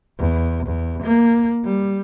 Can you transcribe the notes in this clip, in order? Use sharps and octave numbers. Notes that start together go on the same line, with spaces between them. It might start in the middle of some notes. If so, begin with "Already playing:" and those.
E2
E2
A#3
G3